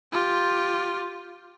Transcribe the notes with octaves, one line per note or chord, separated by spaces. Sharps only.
F4 G4